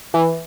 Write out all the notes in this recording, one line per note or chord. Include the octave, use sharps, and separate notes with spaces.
E3